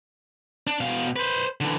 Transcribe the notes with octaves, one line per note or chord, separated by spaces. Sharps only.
D4
B2 F5
B4 C5
D3 E3